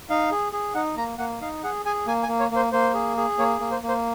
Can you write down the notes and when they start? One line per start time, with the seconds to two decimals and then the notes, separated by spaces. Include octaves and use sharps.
0.10 D#4 F5
0.31 G#4
0.53 G#4
0.75 D#4 F#5
0.96 A#3 A#5
1.18 A#3 F#5
1.41 D#4 F5
1.63 G#4 F#5
1.85 G#4 G#5
2.07 A#3 G#5
2.23 G#5
2.28 A#3
2.40 C#5
2.51 A#3
2.56 C5
2.72 A#3 C5
2.94 G#4
3.17 G#4
3.38 A#3 C#5
3.60 A#3
3.71 C5
3.82 A#3
3.88 C5